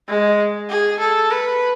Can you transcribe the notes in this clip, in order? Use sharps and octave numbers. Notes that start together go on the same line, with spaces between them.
G#3
G#4
A4
B4